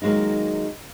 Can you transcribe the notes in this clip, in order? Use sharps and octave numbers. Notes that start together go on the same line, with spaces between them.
D#3 F#3 G#3 A#3 D#4